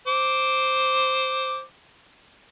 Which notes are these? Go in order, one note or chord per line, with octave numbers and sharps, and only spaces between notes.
C5 D6